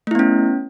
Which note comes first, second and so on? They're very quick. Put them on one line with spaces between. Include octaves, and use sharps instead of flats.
A3 E4 B3 C#4